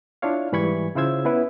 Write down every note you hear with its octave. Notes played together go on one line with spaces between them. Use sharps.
D4 E4 F4 C#5 F5
G#2 E3 G3 B5 C#6 G#6
C#3 E4 F4 C5 E6 G#6
B3 C#4 E4 B4